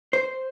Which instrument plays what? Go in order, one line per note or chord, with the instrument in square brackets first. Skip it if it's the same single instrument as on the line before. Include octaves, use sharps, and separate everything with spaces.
[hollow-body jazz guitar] C5